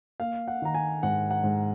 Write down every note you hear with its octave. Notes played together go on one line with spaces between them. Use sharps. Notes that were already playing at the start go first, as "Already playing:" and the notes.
A#3 F5
F#5
D#3 A#5
G#5
G#2 F#5
F#5
G#2